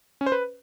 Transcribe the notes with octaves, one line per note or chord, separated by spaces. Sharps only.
C#4
C5
B4